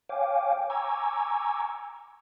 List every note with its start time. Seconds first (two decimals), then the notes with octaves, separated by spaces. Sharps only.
0.09 C#5 F5 G5 G#5 D6
0.70 G#5 A#5 C#6 D6 E6 G#6